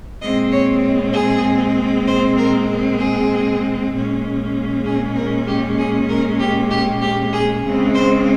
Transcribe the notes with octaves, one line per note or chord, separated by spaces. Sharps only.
A#2 G#3 C4 D#5
C#5
G#4
C5
A#4
G#4
A#2 G#3 C#4
G#4
A#4
G4
G#4
A#4
G4
G4
G4
G#4
C#3 G#3 C4
C5